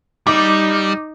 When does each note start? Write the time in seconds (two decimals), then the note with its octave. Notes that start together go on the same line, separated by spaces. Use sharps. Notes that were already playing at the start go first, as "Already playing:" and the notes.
0.27 G3 D#4 D6